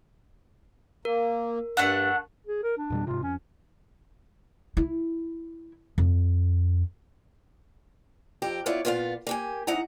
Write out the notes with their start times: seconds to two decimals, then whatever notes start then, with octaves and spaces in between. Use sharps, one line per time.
1.05 A#3 A#4
1.77 G2 A3 D4 F#5
2.47 G#4
2.63 A#4
2.77 D4
2.90 F2 B2 G3
3.07 G#2 C3 F4
3.23 F2 C#4
4.77 E4
5.98 F2
8.42 F2 G4 A#5
8.66 B3 E4 F4 C#5 D5
8.85 A#2 B3 F4 B4 F5
9.27 A#3 G4 G#5
9.67 E2 D#4 E4 F#5 A#5